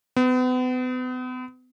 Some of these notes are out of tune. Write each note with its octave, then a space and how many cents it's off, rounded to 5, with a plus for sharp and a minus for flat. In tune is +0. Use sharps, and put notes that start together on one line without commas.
B3 +40